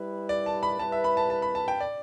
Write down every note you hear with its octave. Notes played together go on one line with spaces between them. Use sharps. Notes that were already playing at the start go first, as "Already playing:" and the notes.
Already playing: G3 E4 B4
D5
A5
B5
G3 E4 B4 A5
E5
B5
A5
A5
B5
A5
G5
D5